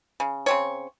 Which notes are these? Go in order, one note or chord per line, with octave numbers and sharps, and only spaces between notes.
C#3
C#3 C4 C#5